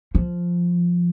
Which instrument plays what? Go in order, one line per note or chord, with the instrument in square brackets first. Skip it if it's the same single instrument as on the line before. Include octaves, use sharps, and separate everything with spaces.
[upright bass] F3